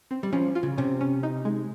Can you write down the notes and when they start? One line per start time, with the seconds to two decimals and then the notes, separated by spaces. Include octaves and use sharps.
0.11 C4
0.23 G3
0.33 F3 C#4
0.55 F4
0.63 C#3
0.78 C3 C#4
1.01 C#4
1.23 D#4
1.45 G#3